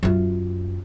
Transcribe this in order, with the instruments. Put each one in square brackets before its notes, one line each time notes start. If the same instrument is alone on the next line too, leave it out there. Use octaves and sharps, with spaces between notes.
[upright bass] F#2 F4